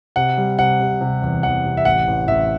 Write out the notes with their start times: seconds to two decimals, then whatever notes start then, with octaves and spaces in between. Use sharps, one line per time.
0.16 C3 F#5
0.37 G3
0.59 C3 F#5
0.80 C3
1.01 C3
1.22 E2
1.43 E2 F#5
1.65 C3
1.77 E5
1.85 A1 F#5
2.07 A1
2.28 A1 E5